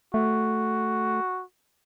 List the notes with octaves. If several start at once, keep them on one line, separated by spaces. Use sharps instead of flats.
A3 F#4